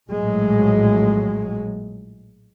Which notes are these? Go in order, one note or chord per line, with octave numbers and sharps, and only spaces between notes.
A#1 A2 F#3 G#3